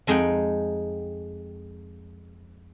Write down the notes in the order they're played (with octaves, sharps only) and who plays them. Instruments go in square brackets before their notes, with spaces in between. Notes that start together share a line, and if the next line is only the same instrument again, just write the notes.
[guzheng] F2 G#3 D#4 F#5 G5